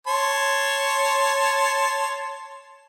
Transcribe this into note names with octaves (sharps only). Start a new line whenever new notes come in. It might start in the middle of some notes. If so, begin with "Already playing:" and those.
C#5 A5 C6